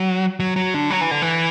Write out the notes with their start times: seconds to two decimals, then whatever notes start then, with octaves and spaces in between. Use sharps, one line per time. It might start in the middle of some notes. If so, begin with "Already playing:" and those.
Already playing: F#3
0.40 F#3
0.56 F#3
0.74 D3
0.90 F#3
1.01 E3
1.11 D3
1.22 E3